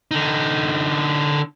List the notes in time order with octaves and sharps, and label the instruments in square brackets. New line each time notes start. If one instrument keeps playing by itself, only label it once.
[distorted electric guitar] D3 D#4